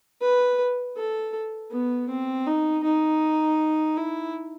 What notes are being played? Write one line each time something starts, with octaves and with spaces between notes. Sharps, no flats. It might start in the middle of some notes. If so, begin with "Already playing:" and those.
B4
A4
B3
C4
D#4
D#4
E4